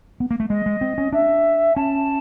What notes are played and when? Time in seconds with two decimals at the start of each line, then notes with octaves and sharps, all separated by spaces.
0.20 B3
0.31 A#3
0.40 A3
0.50 G#3 D#5
0.66 G#3
0.81 C4
0.98 C#4
1.12 D4 E5
1.76 C#4 A5